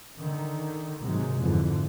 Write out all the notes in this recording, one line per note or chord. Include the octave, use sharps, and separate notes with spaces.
D3 D#3
G#2 C3 D#3 F#3 G#3
F2 G#2 D3 E3